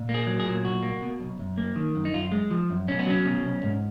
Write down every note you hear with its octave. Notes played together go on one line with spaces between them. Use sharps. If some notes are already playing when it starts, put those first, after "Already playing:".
Already playing: A#2
A#3
G#4
F#3
G#4
A#2
B1 F#4
A#3
B2
B1
F#2
A#3
D#3
F#2
D#4
F#2 F4
G#3
F3
F#2
B1 C#4
B3
F#3 C#4
B2
B1
G#2